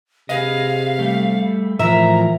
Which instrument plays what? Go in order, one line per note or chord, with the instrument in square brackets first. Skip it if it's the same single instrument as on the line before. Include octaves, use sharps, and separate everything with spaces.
[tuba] C3 [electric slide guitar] G#4 B4 D#5 [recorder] F5
[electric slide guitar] G3 A3
[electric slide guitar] A2 E3 A#4 [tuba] F3 [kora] E5 [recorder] A#5